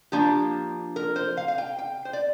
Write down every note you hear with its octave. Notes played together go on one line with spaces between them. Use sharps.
F3 A#3 D4 G4
A#4
C5
F5
F5
G5
G5
C5
D5